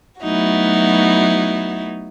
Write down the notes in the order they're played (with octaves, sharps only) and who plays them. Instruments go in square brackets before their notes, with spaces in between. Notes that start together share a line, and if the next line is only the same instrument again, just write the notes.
[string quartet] F#3 A3 B3 D#4 E4 F#4